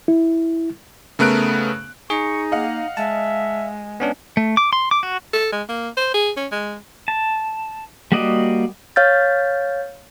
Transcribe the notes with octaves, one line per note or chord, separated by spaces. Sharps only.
E4
C#3 A3 B3 A#4 F#6 D7
D#4 G#4 C#6
A#3 D#5 F5 F#5
G#3 E5 A5
B3 C#4 D4
A3
D6
C6
D6
F#4
A4
G#3
A#3
C5
G#4
C#4
G#3
A5
G3 A#3 F#4 D5 D#5
C#5 F5 F6 G6 A6